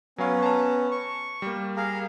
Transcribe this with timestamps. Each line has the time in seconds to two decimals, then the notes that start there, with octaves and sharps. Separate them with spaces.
0.18 F#3 B3 C#4 F5
0.43 A5 A#5
0.91 C#6
1.42 G3 A#3
1.76 G#4 A#4 F5